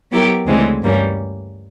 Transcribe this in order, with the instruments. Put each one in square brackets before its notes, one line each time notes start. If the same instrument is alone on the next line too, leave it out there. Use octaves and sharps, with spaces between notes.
[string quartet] F#3 B3 E4 G4 A#4
D2 C#3 E3 G#3 C4
G2 E3 G3 A#3 C#4